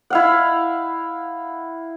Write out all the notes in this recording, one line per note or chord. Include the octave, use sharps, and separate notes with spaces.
E4 F5 F#5